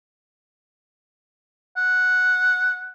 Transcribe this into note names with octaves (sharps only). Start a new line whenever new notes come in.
F#5